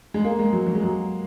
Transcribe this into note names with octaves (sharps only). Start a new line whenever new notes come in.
G#3
A#3
G#3
F#3
F#3
G#3
F#3